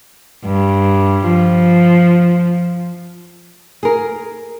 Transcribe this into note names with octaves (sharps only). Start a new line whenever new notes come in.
G2
F3
G#4 A#4